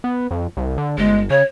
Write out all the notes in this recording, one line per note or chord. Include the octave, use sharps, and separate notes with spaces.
B3
F2
C2
D3
G1 G#3
C#3 C#5